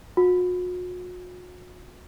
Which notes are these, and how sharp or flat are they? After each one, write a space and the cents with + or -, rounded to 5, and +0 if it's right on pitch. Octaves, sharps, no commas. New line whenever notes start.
F#4 -45